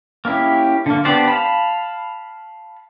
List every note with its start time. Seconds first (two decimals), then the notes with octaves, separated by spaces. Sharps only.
0.25 A#3 C#4 E4 G4
0.86 D3 A#3
1.05 B3 D4 G4 C5 D5
1.28 F5 A5 B5